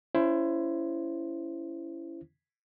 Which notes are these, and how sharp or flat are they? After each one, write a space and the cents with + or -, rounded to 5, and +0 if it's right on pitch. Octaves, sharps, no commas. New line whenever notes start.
C#4 +30 E4 +25 C5 +5